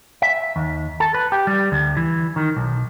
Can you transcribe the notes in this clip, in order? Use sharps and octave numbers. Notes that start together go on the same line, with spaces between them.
E5
D#2
A4
B4
G4
G3
D2
E3
D#3
B1